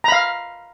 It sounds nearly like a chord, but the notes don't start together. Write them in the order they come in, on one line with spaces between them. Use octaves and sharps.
A#5 B5 F5